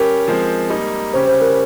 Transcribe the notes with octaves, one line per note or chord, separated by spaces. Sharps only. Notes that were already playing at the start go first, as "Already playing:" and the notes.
Already playing: G3 C#4 G4 A#4
F3 G#3 C4
G3 A#3 D#4
C#3 G3 C#4 G4 C5
C5
A#4